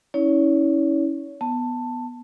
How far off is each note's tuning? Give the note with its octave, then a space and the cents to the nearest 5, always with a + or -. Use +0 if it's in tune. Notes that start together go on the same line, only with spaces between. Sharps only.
C#4 +0 E4 -35 C#5 +35
B3 +0 A5 +10